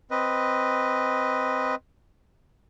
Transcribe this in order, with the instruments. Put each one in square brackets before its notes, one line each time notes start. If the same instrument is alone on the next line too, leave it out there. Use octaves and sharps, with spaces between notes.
[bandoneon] C4 B4 D#5